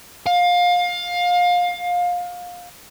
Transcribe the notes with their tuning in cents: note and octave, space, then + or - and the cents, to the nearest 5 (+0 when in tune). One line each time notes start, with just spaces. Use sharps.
F5 +25